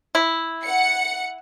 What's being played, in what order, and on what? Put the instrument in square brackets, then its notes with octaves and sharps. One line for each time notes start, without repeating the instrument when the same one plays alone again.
[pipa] E4
[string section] F#5 C#7